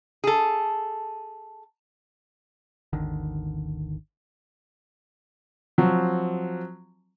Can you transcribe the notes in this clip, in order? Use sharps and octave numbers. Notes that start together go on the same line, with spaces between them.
G#4 A4
G#1 D#2 D3 D#3
F3 F#3 C4